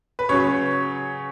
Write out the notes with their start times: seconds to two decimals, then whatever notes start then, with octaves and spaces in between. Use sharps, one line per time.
0.19 B4
0.29 C#3 F#3 C#5